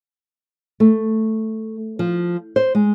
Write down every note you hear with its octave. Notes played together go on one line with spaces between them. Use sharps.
A3
F3
C5
G#3